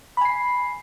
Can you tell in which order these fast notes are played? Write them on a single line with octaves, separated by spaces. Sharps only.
B5 G#5 C7